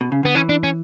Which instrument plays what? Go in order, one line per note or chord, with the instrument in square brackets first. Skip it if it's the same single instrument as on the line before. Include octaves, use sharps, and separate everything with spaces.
[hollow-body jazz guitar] B2
C#3
[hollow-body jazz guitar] D3 [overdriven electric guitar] B3
[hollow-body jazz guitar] E3 [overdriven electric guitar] C#4
[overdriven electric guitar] D4
C#4